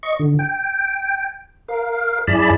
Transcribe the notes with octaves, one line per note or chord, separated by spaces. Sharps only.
D#5 C#6
D3
G5
A#4 F5
F#2 E4 G#4 D5 A5 B5